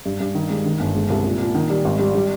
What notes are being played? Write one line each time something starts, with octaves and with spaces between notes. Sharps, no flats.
G2
G2
D#3
G#3
D#3
G1
G#3
C2
A#2
A#2
D#3
G3
G#1
G3
G3